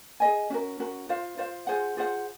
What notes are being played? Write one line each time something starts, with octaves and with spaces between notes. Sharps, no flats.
G#4 D#5 G#5
C#4 F#4 A#4
C#4 F#4 A#4
F4 C5 F5
F4 C5 F5
F4 G#4 C5 F#5
F4 G#4 C5 F#5